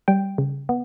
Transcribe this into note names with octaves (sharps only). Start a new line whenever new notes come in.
G3 G5
C#3
B3